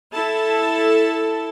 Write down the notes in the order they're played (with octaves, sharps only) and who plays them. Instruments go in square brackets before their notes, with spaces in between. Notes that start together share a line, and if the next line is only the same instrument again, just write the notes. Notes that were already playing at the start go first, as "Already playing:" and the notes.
[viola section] E4 A4 A5